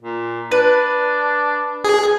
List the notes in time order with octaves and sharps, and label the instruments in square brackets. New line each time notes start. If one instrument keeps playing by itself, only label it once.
[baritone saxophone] A#2
[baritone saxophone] D4 [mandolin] B4
[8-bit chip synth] G#4